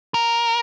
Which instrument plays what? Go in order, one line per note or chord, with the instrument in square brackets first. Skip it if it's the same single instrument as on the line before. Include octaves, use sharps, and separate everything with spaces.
[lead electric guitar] A#4